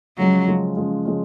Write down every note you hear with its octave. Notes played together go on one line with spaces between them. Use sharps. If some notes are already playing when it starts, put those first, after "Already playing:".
C#3 F3 F#3 G#3 C#4
C#3 F3 G#3 C#4
C#3 F3 G#3 C#4
C#3 F3 G#3 C#4